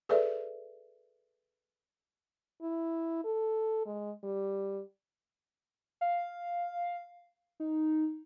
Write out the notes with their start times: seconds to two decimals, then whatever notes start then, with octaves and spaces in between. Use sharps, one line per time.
0.09 G#4 A4 B4 D5 E5
2.62 E4
3.24 A4
3.86 G#3
4.24 G3
6.01 F5
7.60 D#4